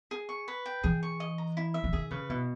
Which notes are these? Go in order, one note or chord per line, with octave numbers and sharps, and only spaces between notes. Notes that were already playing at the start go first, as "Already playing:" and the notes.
G#4
C#6
B4
G5
E3 G#4
C#6
D#5
A#5
E4
E5
E3
D#3 G#4
C#3 B4
B2 E4